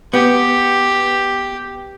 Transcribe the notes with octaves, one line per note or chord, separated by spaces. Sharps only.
B3 G4